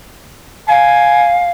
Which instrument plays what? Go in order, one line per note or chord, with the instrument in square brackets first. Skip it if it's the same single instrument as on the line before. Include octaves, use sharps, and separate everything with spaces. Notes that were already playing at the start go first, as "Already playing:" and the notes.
[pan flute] F5 [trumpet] G#5